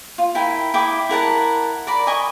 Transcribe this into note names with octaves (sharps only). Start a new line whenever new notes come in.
F4
E4 A#4 G5 G#5
E4 G5 D6 D#6
E4 A#4 F#5 A5
A#4 D5 B5
D#5 G#5 C#6 D#6